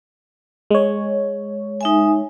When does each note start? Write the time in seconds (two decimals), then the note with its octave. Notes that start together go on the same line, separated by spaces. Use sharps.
0.71 G#3 C#5
1.81 D#4 E5 G#5